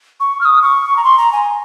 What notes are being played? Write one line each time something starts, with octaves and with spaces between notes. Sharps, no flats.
C#6
F6
D#6
C#6
A#5
C6
A#5
G#5